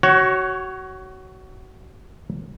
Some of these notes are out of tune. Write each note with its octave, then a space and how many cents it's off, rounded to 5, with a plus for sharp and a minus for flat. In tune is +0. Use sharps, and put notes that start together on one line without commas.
F#4 +25 C#5 +0